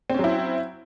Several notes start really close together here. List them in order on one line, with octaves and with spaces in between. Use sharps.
C4 C#4 F#3 E4